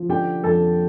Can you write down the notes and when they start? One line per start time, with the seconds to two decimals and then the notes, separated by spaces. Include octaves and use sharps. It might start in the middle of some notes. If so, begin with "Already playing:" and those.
Already playing: F3
0.09 D3 G4 G5
0.44 F2 A4 A5